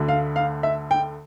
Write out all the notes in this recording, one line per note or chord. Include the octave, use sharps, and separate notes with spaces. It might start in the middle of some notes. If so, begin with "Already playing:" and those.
Already playing: D2 D3 A3
F5
F5
E5
G5